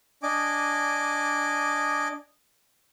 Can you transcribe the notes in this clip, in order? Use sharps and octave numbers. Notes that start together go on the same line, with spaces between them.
D4 D#5 G#5 D6